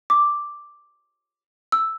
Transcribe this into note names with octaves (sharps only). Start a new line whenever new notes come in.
D6
E6